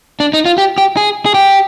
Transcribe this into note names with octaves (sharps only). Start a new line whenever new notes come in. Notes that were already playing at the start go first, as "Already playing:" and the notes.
D4
D#4
F4
G4
G4
G#4
G#4
G4